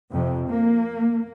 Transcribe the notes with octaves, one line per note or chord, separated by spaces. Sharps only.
F2 C3
A#3